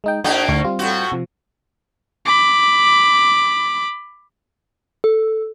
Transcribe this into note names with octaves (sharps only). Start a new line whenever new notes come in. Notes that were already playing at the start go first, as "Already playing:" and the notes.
G#3 D#4 G5
G#2 A#3 D4 F#4 D#5 G5
D2 D3 C#6
G3 C4 F4
A2 F#4
C3 F3
B5 D6
A4